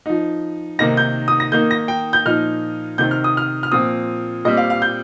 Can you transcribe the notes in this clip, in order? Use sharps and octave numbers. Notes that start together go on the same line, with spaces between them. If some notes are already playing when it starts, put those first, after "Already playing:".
F3 D#4
C3 D#3 A#3 D#4 A#6
G6
D#6
A#6
D#3 A#3 D#4 G6
A#6
G5
G6
A#2 F3 D#4 F6
C3 D#3 C4 G6
F6
D#6
F6
F6
A#2 F3 C4 D#6
A#2 G3 C4 D#5
F5
F5
G6